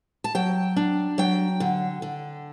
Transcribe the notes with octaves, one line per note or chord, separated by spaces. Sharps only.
A5
F#3 G5
D4
F#3 G5
D3
D3